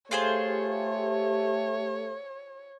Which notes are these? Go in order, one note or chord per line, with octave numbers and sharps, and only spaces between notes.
A3 F4 G4 G#4 C5 C#5